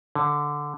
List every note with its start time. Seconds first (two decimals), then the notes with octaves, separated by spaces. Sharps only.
0.15 D3